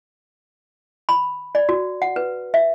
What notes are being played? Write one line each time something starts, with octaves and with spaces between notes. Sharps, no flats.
B5
D5
F#4
F#5
B4
E5